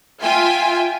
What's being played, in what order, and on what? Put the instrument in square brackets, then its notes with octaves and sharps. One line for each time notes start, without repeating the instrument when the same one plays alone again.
[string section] F4 E5 G5 G#5